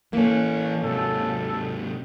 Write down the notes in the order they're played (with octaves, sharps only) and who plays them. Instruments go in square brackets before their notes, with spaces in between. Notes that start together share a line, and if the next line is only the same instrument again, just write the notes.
[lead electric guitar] E3 A4 [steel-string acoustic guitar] A#3 C#4
[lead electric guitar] G#2 C3 [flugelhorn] A4